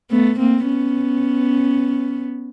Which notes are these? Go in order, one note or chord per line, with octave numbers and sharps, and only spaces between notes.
A3 B3
A#3 C4
B3 C#4